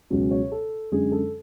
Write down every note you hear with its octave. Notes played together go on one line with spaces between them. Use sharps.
C#2 B2 F#3 C#4
C#5
A4
F#2 D3 G#3 C#4 G#4
A4